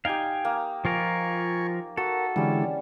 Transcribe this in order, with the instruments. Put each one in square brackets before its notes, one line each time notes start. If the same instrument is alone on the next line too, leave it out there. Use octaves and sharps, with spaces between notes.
[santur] D#4 G4 [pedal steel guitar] F5 G5 G#5
[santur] A#3
[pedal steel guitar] F3 F4 A#4 [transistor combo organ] G#5 C#6
[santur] F#4 [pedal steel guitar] A4 [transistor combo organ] A#4
[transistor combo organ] D3 E3 G#3 [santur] G3 C#4